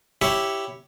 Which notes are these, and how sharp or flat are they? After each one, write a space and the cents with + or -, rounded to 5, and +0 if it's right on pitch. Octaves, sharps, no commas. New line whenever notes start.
E4 +0 G4 +0 C#5 +0